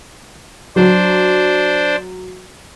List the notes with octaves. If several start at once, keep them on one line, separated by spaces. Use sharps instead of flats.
F#3 D4 C5